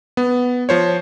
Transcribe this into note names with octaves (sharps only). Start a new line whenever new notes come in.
B3
F3 C5 C#5